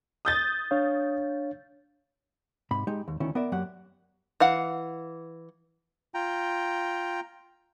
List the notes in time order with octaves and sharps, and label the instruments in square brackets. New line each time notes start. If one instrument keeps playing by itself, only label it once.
[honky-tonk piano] D#6 G6 A6
[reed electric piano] D4 C#5 F5
[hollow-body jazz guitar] G#2 C3 B5
G#3 D#4 G4
D#2
D2 D#3 C#4 E4
B3 A#4 D5 E5
F#2 F#3 A#3 G4 F#5
[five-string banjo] E3 F5 F#5
[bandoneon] F4 G5 A#5